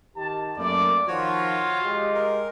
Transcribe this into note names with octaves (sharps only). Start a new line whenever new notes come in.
D#3 G4 A5
F#2 A3 A#3 D5
D#3 F3 F4 F#4 C#5
G#3 G4 D#5
A#4